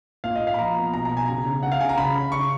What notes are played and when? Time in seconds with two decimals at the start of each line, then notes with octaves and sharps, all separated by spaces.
0.24 A#2 F5
0.36 D#5
0.41 A#2
0.47 F5
0.54 B5
0.59 F3 A#5
0.77 B3
0.93 B2 A#5
1.05 A#5
1.12 B2
1.17 G#5
1.28 C#3 A#5
1.46 C#3
1.63 C#3 F#5
1.72 F5
1.81 C#3 G#5
1.89 A#5
1.97 C#3 B5
2.16 C#4
2.32 C#3 C#6